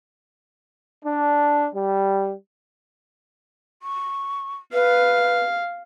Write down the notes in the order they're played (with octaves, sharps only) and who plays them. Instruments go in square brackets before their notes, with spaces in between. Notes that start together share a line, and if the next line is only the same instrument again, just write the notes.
[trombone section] D4
G3
[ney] C#6
[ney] B4 [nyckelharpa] F5